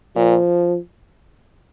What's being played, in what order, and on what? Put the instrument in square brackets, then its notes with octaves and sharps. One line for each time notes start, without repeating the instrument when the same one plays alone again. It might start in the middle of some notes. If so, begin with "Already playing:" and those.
[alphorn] A#2 [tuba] F3